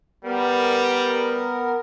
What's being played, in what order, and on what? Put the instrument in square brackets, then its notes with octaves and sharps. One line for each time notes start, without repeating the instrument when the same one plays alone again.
[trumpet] G3 [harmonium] B3 A#4